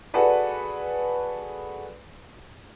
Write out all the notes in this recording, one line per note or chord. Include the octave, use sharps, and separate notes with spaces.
F#4 G#4 A4 B4 D5